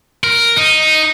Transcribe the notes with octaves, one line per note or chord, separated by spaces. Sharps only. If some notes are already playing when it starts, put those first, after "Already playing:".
A#4
D#4